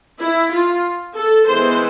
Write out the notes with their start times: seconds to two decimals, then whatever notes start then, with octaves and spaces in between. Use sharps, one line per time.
0.18 E4
0.50 F4
1.15 A4
1.48 E3 G#3 B3 C5